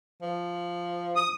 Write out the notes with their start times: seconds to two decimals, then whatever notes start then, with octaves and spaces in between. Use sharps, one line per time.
0.22 F3
1.16 D#6